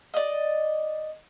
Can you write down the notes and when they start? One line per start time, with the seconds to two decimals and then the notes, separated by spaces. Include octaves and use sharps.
0.14 D5 D#5